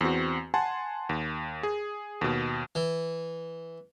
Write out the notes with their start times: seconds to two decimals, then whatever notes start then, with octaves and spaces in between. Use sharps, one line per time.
0.01 E2 C4 F#4
0.54 F#5 G#5 A5 C6
1.09 D#2
1.63 G#4
2.21 D#2 B2
2.75 E3